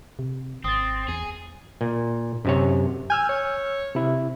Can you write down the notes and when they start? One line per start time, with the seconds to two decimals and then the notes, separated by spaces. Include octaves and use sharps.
0.19 C3
0.64 G#1 C4 D#6 A6
1.08 E2 G#4
1.81 A#2
2.45 F#2 C3 C#5
3.10 G#5 E6 F6 G6
3.29 C#5
3.95 C3 E4